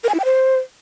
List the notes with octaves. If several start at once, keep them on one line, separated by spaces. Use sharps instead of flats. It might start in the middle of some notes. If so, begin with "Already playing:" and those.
A#4
G#5
E4
G5
C5